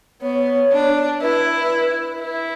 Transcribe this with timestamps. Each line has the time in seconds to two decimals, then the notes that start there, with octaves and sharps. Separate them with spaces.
0.22 B3 C#5
0.72 D4
1.22 E4 B4
2.22 E4